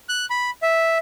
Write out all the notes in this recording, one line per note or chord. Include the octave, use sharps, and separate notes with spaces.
F#6
B5
E5